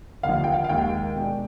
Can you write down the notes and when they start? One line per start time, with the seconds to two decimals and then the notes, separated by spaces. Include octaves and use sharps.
0.23 D#2 D3 F3 F5
0.44 G5
0.54 F5
0.64 F5
0.69 D#2 D#3 G#3 G5
1.16 B2 G#3 D4